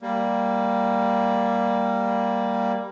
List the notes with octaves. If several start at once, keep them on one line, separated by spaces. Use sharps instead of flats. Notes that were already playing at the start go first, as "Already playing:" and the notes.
G3 A#3